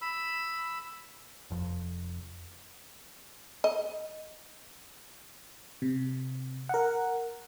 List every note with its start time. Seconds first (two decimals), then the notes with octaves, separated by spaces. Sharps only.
0.02 B5 E6
1.50 F1 F2
3.64 D#5
5.82 C3
6.69 A#4 F#5